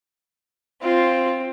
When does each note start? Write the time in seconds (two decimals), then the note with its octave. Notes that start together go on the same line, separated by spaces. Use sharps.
0.83 C4 F4